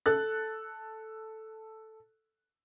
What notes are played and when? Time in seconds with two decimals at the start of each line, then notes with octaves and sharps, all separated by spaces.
0.06 A4 F#6 A6